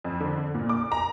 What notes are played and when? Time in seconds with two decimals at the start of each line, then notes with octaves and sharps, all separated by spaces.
0.04 F2
0.21 D3
0.54 A#2
0.69 D6
0.92 A#5